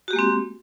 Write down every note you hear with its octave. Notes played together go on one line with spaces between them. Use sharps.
G#3 A#3 C4 F#4 G4